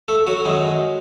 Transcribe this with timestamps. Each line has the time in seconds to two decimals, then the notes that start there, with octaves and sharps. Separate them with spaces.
0.08 A3 A4
0.27 F#3 F#4
0.45 F#2 D#3 G#3